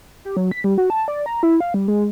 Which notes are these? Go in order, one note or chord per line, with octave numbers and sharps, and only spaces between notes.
G4
F#3
B6
G3
F#4
A5
D5
A#5
E4
F5
G3
G#3